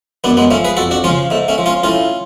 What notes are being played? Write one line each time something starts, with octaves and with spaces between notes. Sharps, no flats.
F#2 B3 D4
G#3 B3
F3 A3 C#4
G#4 B4
F2 F#4 A4
D4 F#4
C#3 F3 C#4 F4
G#2 A3
A3 C#4
F3
C#4 F4
A2 C#4 F4